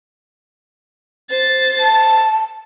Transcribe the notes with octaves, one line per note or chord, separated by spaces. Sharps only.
C5 A6
A5